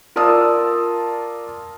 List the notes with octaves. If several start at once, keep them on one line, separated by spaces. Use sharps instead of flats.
F4 A#4 D5 A5 D#6 E6